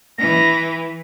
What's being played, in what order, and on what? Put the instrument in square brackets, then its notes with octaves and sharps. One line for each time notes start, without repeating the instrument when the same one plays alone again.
[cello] E3 [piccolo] A#6